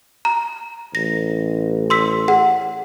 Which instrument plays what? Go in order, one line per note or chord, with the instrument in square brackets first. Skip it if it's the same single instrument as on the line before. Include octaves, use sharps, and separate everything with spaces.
[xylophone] A#5
[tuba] A1 [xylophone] A#6
[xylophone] C6 E6 B6
G#4 F#5